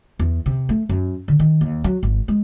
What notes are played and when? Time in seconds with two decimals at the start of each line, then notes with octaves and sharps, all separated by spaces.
0.19 E2
0.46 C3
0.69 A3
0.89 F#2
1.28 D3
1.39 D#3
1.61 D#2
1.84 F#3
2.03 G#1
2.28 G#3